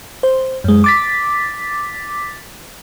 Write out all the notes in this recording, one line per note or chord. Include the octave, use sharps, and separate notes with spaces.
C5
F#2 G#3
D6 A6 B6